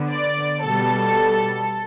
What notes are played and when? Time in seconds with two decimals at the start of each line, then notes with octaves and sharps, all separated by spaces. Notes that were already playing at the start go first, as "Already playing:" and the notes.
Already playing: D3 B3
0.10 D5
0.63 B2 G3 B3 A4